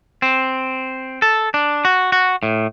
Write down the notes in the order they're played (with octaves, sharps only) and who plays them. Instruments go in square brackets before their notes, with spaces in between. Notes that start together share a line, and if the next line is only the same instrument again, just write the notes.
[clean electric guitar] C4
A4
D4
F#4
F#4
A2